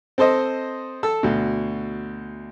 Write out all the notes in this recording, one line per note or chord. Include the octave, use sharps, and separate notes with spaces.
C4 A4 C5 D#5
A4 E6
D2 B2